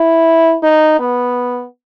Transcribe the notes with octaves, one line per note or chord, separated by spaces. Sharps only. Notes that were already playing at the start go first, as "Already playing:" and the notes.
Already playing: E4
D#4
B3